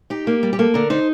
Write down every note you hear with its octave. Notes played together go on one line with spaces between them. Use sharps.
D#4 G4
A#3
G3
G4
A#3 A4
D3 A#4
D#4 C5